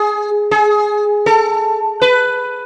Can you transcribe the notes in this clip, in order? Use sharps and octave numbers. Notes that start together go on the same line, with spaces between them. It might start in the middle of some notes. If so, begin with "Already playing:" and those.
Already playing: G#4
G#4
A4
B4